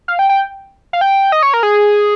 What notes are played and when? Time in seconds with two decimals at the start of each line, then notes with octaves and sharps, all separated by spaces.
0.08 F5
0.19 G5
0.29 G5
0.93 F5
1.01 G5
1.32 D#5
1.43 C#5
1.54 A#4
1.63 G#4